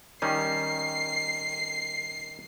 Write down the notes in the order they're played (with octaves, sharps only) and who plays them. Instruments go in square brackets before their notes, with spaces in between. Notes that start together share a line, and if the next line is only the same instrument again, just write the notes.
[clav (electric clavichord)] D#3 G3 C#4 [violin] C7